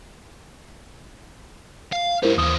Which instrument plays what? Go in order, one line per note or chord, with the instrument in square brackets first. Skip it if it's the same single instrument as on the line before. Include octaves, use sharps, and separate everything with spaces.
[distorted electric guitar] F5
[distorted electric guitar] G#2 G4 [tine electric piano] E4 A#4 C5
[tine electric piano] D#2 D#6 [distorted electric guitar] E3 C5